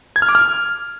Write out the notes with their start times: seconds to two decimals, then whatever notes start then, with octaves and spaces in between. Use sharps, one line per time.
0.16 G#6
0.22 F6
0.29 D6
0.35 F6